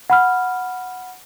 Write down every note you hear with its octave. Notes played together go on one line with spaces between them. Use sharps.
F#5 B5 F6